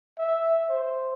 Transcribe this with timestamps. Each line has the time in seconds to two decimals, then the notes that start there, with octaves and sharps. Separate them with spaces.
0.18 E5
0.69 C5